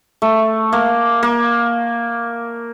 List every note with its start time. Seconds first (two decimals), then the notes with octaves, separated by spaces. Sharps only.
0.22 A3
0.73 A#3
1.23 A#3